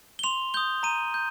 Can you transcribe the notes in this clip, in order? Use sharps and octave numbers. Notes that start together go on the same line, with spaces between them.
G7
C6 F7
D#6 G6 G7
A#5 D#7
G6